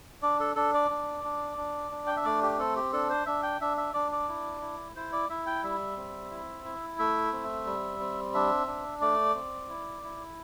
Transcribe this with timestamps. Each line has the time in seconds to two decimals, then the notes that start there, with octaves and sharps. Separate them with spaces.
0.22 D4 D5
0.40 A4
0.56 D4 A4
0.74 D5
0.90 D4
1.24 D4
1.57 D4
1.91 D4
2.07 G5
2.17 E5
2.25 A3 D5
2.43 G4
2.58 C4 A4
2.76 G4
2.93 D4 A4
3.10 C5
3.26 D4 E5
3.43 G5
3.61 D4 E5
3.77 E5
3.94 D4 D5
4.12 D5
4.29 E4
4.61 E4
4.96 E4 C5
5.13 D5
5.29 E4 E5
5.46 G5
5.63 G3 E5
5.97 C4
6.31 E4
6.64 E4
6.98 A3 E5
7.32 C4
7.66 G3
8.00 C4
8.34 D4 E5
8.67 D4
9.01 A3 D5
9.35 C4
9.69 E4
10.03 E4